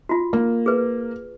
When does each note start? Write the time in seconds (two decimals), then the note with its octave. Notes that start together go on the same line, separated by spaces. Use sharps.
0.09 F4 F#4
0.33 A#3
0.66 G#4 B4